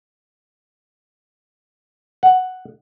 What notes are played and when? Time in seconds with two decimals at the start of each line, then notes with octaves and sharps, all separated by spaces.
2.23 F#5